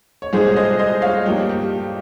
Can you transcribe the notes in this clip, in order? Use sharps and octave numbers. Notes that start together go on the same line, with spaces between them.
C#5
C2 A#2 G#3 D#4 G#4 C5
C5 D#5
C5 D#5
C#5 F5
G2 F3 A#3 D#4 G4
G4